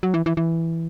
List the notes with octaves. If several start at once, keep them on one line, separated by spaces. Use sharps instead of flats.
F#3
E3
E3
E3